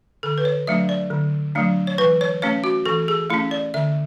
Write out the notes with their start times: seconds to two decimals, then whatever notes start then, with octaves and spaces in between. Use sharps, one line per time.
0.23 D3 A4
0.38 B4
0.45 C#5
0.67 F#3 A3 D4 E5
0.89 D5
1.11 D3
1.55 F#3 A3 D4
1.87 C#5
1.98 E3 B4
2.21 C#5
2.42 A3 C#4 C#5
2.64 F#4
2.86 E3 A4
3.08 G#4
3.30 A3 C#4 E4
3.51 D5
3.74 D3 E5